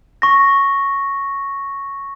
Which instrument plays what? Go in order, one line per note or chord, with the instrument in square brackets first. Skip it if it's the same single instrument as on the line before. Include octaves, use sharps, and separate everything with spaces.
[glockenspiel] C#6 A#6